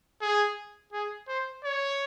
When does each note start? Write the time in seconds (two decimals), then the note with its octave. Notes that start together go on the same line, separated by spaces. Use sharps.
0.22 G#4
0.93 G#4
1.28 C5
1.64 C#5